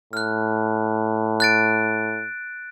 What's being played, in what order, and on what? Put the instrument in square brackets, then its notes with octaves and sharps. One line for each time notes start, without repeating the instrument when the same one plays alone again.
[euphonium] A2 [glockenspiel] F6 F#6
[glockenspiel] F#6 A6 D7